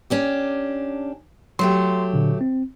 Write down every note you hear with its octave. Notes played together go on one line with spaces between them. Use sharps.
C#4 D4 G4
F#3 A3 G4 C6
A#2 D3
C4